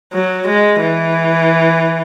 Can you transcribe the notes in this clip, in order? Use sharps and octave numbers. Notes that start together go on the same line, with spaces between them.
F#3
G#3
E3